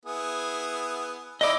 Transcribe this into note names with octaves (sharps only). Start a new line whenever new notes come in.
B3 E4 G#4
D#4 E4 D5 D#5 E6